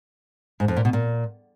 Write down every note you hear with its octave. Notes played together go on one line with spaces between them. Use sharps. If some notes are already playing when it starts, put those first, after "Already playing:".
G#2
F2
A#2
B2
A#2